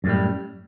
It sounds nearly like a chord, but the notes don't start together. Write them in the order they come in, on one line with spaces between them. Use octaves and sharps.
F#2 A2 G3